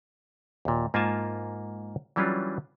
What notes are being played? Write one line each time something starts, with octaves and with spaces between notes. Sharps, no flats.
D#2 A#2
G#2 A#3 F4 A#4 G#5 A5
E3 F#3 G3 C#4 D4 F4